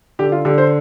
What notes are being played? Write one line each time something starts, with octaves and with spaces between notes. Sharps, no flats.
D3 G4
F4
D3 G4
C5